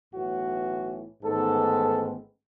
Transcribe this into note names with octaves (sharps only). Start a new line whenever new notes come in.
B1 A2 E3 F#4
A1 G#2 D#3 G#3 B3 A4